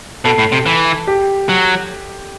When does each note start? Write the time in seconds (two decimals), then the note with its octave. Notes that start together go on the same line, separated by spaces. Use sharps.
0.24 B2 A4
0.38 A2
0.52 C3
0.66 E3
1.07 G4
1.49 F#3